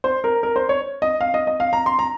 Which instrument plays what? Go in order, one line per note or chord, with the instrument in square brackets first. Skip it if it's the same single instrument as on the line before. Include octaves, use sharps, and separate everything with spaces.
[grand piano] C5
A#4
A#4
C5
C#5
D#5
F5
D#5
D#5
F5
A#5
C6
A#5